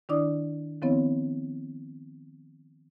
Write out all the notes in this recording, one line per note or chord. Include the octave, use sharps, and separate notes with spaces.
D#3 D4 E4 D5 D6 D#6
D#3 F3 B3 C4 E4 C#5